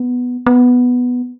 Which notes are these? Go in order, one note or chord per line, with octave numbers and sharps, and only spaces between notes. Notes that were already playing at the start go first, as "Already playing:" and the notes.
Already playing: B3
B3